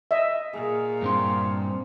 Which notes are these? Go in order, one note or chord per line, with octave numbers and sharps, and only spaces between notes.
D#5 E5
A#2 G#4 D5
G2 C4 A#5 C6